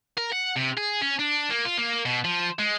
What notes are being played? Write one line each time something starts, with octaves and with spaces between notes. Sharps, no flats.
A#4
F#5
C3
G#4
C#4
D4
A#3
F4
A#3
B2
F3
G#3